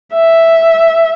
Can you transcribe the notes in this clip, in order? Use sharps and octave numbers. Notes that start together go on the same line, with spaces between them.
E5